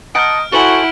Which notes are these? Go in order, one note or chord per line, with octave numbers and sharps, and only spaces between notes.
D#5 F#5 A5 A#5 F6 G6 D7
E4 F#4 A4 C5 F#5 G#5 F#7 G7